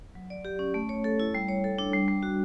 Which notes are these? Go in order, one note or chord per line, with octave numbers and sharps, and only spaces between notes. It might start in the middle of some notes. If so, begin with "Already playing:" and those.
F#3
D5
G4
C#4
A3
C#5
A4
E4
G3
C#5
A4
D4
G3
G3
F#4